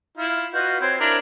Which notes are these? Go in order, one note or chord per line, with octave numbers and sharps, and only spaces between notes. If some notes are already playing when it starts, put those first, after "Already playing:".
E4 F4
F4 F#4 B4 D#5 G6
C4 C5 C#5 B5
D4 E4 A#4 G#6